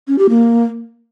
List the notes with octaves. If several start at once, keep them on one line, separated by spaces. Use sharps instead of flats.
C#4
G4
A#3